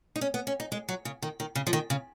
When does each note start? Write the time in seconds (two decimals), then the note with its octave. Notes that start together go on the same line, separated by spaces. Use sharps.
0.16 D#4
0.21 C#4
0.34 B3
0.47 C#4
0.60 D#4
0.72 G#3
0.89 F#3
1.05 C#3
1.22 D#3
1.40 D#3
1.55 C#3
1.67 F3
1.73 D#3
1.90 C#3